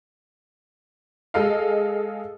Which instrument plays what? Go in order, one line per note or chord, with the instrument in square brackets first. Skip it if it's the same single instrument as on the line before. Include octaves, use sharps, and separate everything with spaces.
[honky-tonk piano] G#3 G#4 A4 D#5 F5